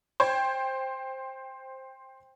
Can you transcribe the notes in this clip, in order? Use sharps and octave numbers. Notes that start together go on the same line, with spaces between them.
C5 G5 G#6